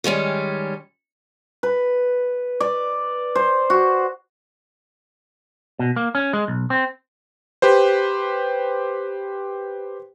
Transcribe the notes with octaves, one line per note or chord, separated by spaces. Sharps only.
D#3 G3 G#3 C#4
B4
D5
C5
F#4
B2
A#3
C#4
G#3
B1
C4
G4 B4 C5